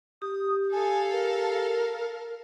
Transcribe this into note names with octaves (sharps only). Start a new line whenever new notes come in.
G4 D#6
A4 F5 G#5
A#4